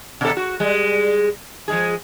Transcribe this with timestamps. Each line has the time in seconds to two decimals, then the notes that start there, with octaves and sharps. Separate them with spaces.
0.21 B2 A4
0.37 F#4
0.60 G3 G#3
1.68 F3 G#3 G#4